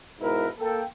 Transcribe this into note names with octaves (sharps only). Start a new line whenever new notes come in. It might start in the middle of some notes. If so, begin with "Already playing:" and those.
G#2 B2 E4 A#4 B4
A#3 A4 G5